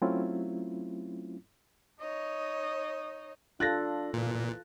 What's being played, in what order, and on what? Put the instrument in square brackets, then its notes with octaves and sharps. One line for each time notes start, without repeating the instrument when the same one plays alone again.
[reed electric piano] F#3 A3 C4 C#4 E4 F4
[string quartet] D#4 C#5 D#5
[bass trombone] D4 [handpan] F4 A4 [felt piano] F#6 A6 A#6
[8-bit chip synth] A#2 [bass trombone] E3